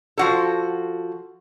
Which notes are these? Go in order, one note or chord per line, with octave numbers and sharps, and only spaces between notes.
F3 F#4 A4